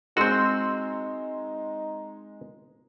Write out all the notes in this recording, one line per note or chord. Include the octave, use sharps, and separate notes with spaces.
G#3 C4 D#4 F#4 C6 E6